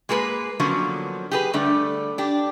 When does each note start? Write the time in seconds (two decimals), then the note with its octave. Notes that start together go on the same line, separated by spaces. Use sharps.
0.09 G#3 A#3 G#4 A#4 B4
0.60 D3 F3 F#3 A#3 B3 C#4
1.31 G4 G#4 B4
1.53 D3 G3 A3 D4
2.18 D4 G4